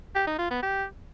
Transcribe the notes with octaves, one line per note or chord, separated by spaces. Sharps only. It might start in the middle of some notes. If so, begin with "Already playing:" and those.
G4
D#4
F4
B3
G4